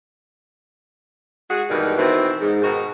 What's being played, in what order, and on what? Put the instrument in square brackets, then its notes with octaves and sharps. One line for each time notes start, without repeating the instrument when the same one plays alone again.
[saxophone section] G#3 F#4 G#4
G2 B2 D#3 E3 G#3
B2 D#3 E3 C4
G#2
G#2 B2 D#3 D#4 F#4